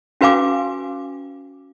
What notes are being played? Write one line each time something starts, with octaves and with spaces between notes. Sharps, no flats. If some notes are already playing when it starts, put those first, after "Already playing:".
C#4 F#4 B4 F5 G#5 D6